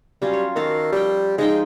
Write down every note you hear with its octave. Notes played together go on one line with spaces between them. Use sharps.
F#3 G3 C#4 F4
C#5
D#3 F#4 A4 F5
F3 G3 G5
F3 G#3 D#4 G5